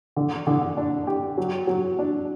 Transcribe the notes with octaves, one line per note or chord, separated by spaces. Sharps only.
D3
D3
D4
G4
F#3
F#3
D4